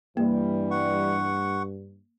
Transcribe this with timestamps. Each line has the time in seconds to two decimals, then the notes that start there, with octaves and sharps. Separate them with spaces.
0.17 G2 E3 G3 A#3
0.71 F#5 C#6